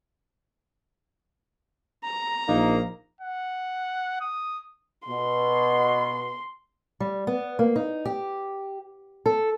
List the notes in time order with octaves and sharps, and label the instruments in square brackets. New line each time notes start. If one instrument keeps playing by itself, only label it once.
[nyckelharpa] A#5
[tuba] A#1 [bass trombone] A#3 [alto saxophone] D#4
[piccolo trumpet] F#5
D#6
[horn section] B2 [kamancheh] C6
[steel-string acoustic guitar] G3
B3
A#3
D#4
G4
A4